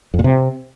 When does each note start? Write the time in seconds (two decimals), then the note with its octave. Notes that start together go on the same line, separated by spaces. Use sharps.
0.14 F2
0.19 A#2
0.24 C3